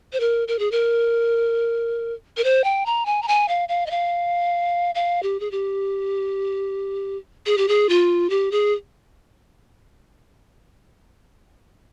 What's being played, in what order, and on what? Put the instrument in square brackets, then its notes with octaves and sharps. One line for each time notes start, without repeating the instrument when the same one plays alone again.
[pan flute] C5
A#4
A#4
G#4
A#4
A#4
C5
G5
A#5
G#5
A#5
G#5
F5
F5
D#5
F5
F5
G4
G#4
G4
G#4
G4
G#4
F4
G4
G#4